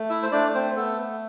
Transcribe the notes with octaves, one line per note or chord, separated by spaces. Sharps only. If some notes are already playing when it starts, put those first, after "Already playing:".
Already playing: A3
E4 E5
C5
A3 D4 D5
C4 C5
B3 A4